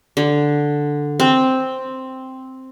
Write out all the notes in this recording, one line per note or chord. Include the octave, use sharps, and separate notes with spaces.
D3
C4